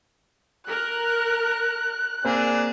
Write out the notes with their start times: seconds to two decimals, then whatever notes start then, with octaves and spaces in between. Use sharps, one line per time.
0.67 A#4 F#6
2.25 A#3 C4 D4 G#4